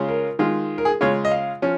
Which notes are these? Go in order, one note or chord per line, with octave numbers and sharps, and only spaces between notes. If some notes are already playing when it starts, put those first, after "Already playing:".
Already playing: C#3 G#3 C#4 F4
A#4
D#3 G#3 F4
A#4
G#4
C#3 G#3 F4 C#5
D#5
F5
F3 C#4